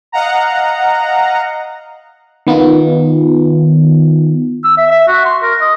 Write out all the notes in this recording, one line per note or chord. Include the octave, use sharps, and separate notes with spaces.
D#5 F5 F#5 A#5
D#3 B3 D#4 F4
E6
E5
E5
F#4
C6
A#4
D#5